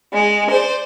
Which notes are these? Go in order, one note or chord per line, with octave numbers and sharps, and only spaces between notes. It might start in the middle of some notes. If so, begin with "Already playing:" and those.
G#3
C5 D5